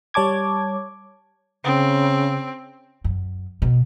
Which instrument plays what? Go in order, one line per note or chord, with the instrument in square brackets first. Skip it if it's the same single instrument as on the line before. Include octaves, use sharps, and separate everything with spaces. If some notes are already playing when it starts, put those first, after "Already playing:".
[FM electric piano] G3 C#5 A5 D6 G#6
[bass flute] C#3 [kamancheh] C4
[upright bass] F#2
B2